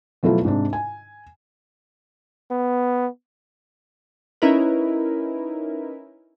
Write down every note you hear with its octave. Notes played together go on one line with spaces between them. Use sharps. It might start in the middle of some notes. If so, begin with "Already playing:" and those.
B2 F3 F#3 A3 E4 F4
G#2 C3 D4
G#5
B3
C#4 D#4 E4 A#4 B4